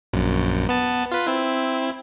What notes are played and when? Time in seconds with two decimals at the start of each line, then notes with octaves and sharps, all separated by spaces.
0.13 A#1 F#2
0.69 B3 A5
1.12 F4 B4
1.27 C4 E4